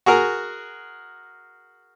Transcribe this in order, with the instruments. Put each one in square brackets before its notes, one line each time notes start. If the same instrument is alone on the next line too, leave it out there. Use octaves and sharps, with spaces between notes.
[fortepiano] F#4 G#4 A#4